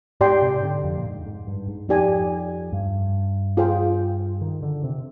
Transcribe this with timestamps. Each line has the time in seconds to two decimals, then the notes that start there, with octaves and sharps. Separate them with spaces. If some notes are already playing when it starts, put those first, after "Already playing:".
0.20 G#2 G4 D5 G5 C6
0.42 C3
0.63 D3
0.84 F2
0.96 A#2
1.05 G#2
1.26 G#2
1.47 G2
1.68 G#2
1.89 F2 D#4 G4 D5 G#5
2.72 G2
3.57 F4 G#4 C5 G5
4.41 D#3
4.62 D3
4.83 C3